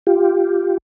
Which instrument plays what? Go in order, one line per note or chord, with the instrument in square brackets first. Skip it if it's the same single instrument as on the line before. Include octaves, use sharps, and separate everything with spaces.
[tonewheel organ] F4 G4